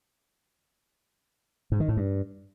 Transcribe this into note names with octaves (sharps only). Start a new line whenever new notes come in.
G#2
D#3
A2
G2